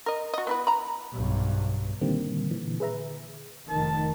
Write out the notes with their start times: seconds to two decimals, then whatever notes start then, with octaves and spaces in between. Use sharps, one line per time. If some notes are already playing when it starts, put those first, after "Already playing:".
0.06 A#4 D#5
0.33 F#4 D#5
0.47 B3 E4 B4
0.67 A#5 B5
1.13 B1 G2
2.01 A#2 D3 D#3 G3 A#3 C4
2.51 A#2 D3 E3
2.80 G#4 B4 E5 A#5
3.69 F1 D#3 A5